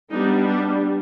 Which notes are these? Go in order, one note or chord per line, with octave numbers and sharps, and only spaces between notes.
G3 B3 D4 D#4
D4